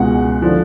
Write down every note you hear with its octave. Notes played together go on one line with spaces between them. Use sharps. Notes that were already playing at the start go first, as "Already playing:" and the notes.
Already playing: C#2 B2 G#3 F#5
D3 F3